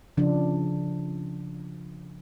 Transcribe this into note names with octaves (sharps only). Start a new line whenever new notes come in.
C#3 F3 D4